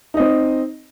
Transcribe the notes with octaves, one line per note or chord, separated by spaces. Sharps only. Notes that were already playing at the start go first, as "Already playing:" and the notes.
C4 D#4 D#5